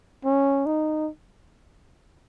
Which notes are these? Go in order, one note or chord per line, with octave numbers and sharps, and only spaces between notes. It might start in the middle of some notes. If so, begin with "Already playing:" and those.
C#4
D#4